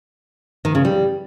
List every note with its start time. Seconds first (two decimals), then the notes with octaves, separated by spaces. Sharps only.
0.65 D#3
0.75 C#3
0.85 G3